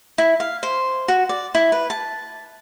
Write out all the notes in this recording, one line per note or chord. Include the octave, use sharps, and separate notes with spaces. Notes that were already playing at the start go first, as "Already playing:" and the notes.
E4
F5
C5
F#4
D5
E4
B4
A5